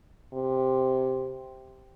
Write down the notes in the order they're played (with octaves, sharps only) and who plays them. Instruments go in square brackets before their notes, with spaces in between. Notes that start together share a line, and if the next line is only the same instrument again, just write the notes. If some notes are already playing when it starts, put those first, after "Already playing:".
[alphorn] C3